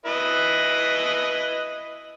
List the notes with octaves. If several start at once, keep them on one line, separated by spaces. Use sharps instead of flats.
E4 B4 D#5